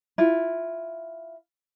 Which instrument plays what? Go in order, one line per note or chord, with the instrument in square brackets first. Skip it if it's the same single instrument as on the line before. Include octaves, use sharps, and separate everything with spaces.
[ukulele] E4 F4